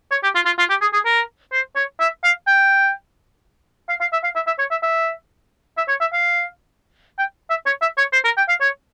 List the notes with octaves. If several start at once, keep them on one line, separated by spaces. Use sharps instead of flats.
C#5
G4
F4
F4
F4
G4
G#4
G#4
A#4
C5
C#5
E5
F5
G5
F5
F5
E5
F5
E5
E5
C#5
E5
E5
E5
C#5
E5
F5
G5
E5
C#5
E5
C#5
C5
A#4
G5
F5
C#5